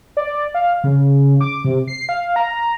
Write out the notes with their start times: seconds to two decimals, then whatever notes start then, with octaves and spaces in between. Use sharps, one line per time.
0.17 D5
0.54 F5
0.84 C#3
1.41 D6
1.64 C3
1.88 C7
2.09 F5
2.36 A#5